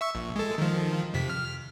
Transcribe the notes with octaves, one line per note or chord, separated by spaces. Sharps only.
E5 C#6 E6
A#1
G#3 A4
D#3 F3
F2 C3 B6
F6